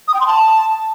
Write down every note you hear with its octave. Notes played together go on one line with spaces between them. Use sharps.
D#6
G5
C6
A5